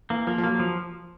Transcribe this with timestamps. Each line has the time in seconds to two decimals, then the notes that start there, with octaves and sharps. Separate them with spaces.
0.10 E3 A#3
0.27 F3 A#3
0.38 F3
0.43 F#3 A#3
0.55 F3 F#3